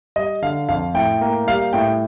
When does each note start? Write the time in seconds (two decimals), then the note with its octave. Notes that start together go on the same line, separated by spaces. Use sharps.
0.16 G3 D#5
0.42 D3 F5
0.69 F2 F5
0.94 A2 G5
1.21 A#3
1.47 G3 F5
1.73 A2 G5